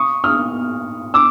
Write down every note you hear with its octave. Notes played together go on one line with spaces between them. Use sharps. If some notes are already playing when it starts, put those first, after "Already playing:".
Already playing: C#6 D#6
D#6 F6
D6 E6